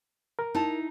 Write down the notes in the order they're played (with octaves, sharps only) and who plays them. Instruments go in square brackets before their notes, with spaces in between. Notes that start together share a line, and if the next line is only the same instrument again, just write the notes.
[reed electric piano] A#4
[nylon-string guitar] D#4 E4 A5